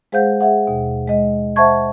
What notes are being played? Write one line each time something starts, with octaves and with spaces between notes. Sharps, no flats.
G#3 G#4 C5 F5 F#5 G6
G#4 E5 F#5
D#2 B2
G#3 D#5
C5 E5 F#5 A5 C#6 G#6